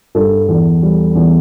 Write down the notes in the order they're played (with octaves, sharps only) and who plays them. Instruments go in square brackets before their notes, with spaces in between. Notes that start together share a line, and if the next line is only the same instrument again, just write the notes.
[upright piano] G2 A4
E2
G3
E2